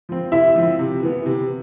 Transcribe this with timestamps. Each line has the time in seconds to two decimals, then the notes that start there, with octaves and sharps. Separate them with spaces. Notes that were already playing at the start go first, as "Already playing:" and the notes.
0.09 F3 C4
0.32 C3 E4 E5
0.56 F3 C4
0.79 C3
1.02 E3 B3
1.26 C3